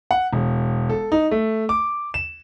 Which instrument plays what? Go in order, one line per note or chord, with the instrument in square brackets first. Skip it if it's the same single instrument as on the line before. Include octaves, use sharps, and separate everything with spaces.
[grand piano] F#5
E1
A4
D#4
A3
D6
E7